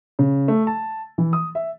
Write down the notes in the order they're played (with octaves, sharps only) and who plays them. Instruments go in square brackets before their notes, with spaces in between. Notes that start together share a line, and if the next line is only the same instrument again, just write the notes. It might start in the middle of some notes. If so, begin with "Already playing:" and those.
[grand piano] C#3
A3
A5
E3
D#6
E5